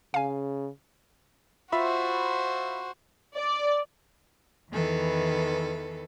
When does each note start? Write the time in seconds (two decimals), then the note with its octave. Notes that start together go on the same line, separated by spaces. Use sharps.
0.14 C#3 F5 G#5
1.72 F4 F#4 C5 E5 B5
3.37 D5
4.71 E2 D#3 E3 A4 B4